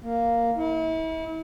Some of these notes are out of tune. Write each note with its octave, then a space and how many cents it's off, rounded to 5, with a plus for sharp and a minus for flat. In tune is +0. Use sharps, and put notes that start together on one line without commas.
A#3 -5
E4 -40